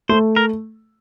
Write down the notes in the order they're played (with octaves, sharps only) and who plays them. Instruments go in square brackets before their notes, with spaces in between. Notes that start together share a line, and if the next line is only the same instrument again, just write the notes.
[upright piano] A3 [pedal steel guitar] C5
[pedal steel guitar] A#4